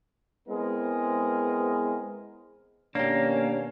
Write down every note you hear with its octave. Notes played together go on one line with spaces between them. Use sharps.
G#3 B3 C4 E4 G#4 A#4
B2 D#3 A#3 C#4 D4 G4 C#5